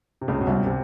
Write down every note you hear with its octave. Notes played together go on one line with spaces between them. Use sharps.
C3
C#2 C#3
B2
C2 C3
C3